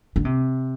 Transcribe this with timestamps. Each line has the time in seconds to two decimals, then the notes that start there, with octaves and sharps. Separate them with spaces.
0.16 D3
0.25 C3